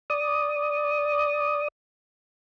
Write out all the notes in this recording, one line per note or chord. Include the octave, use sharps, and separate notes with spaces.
D5 D#6